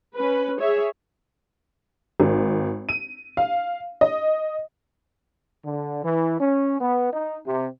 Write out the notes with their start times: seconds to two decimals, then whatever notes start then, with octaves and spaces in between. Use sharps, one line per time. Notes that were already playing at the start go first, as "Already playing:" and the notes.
0.16 C#4 B4
0.60 G#4 C#5 E5
2.20 G#1
2.89 D#7
3.37 F5
4.01 D#5
5.65 D3
6.04 E3
6.40 C#4
6.81 B3
7.13 D#4
7.47 C3